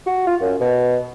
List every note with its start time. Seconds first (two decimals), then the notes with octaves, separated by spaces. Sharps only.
0.06 F#4
0.27 F4
0.41 F#2
0.61 B2